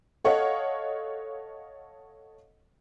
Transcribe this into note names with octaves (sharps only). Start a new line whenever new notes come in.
A4 C#5 D#5 F5 F#5